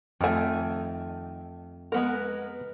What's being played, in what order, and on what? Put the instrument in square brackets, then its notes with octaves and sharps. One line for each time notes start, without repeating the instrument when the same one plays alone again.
[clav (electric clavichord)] F2 A3 [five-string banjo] D#3 G#5
[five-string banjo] G#3 B3 A#4